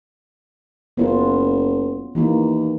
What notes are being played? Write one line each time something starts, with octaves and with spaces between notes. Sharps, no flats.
F#1 B3 C#4 F4
D#2 E3 A#3